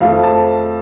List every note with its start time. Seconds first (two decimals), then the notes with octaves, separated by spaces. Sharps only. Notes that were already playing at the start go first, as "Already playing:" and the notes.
0.01 F2 F3 A3 F5
0.23 A5